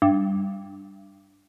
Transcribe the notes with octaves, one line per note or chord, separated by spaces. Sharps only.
G2